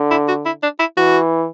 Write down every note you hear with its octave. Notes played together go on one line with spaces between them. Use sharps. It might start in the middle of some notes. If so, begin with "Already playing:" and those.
Already playing: D3
E4
F#4
E4
D4
E4
E3 F#4